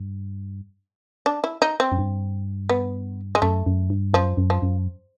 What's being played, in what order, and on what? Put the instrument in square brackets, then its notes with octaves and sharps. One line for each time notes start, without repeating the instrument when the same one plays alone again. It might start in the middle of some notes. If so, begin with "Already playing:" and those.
Already playing: [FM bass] G2
[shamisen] D4
E4
D#4
C4
[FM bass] F#2
G2
[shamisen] B3
G#3
[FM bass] F#2 [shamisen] A3
[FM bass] F#2
G2
[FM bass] F#2 [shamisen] F3
[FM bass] F#2
[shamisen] F3
[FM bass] F#2